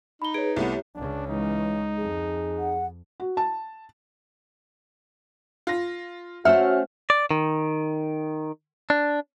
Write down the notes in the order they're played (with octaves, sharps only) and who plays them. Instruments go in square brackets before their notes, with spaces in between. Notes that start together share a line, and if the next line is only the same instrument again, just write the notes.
[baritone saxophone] D#4 [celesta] B5 G7
[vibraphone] G#4 B4 [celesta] C#5 D7
[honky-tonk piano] C2 A3 B3 [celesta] E4 [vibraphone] G4 C#5 E5
[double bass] C#2 C#3 [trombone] D4
[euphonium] E3 [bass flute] G#3 [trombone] D#4
[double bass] F2 [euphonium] G#4
[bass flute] F#5
[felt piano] F#4
A5
[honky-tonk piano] F4 A#6
[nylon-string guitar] A3 C5 F#5 [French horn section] C#4 F#4 [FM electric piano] E5 [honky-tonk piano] F6
[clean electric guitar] D5
D#3
D4